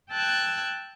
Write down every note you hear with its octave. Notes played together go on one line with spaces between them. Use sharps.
G5 A5 E6 F#6 G#6